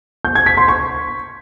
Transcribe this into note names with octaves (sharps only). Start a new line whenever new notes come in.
G6
G#6
B6
C6
C#6